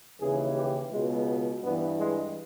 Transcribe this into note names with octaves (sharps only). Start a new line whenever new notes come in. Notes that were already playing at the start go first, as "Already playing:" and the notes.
D#2 C#3 E3 G#4
G4
C#2 B2 G#3
G2 E3 B3
G#3